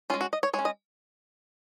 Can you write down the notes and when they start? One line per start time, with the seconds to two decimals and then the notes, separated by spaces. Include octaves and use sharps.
0.10 C#4 F4
0.14 G#3
0.21 F#4
0.33 D#5
0.43 C#5
0.53 G#3 C#5
0.59 C#4
0.65 D#5